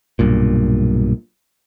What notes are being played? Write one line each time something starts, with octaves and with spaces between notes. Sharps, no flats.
B1 G2 A#2